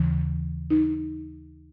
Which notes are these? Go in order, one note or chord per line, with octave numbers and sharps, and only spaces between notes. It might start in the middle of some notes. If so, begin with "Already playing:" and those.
Already playing: D#2 C#3 E3
D#4